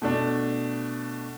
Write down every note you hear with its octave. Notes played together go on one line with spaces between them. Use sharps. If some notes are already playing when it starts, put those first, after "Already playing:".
B2 A3 D4